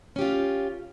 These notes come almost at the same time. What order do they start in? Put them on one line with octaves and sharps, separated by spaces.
C#4 G4 F4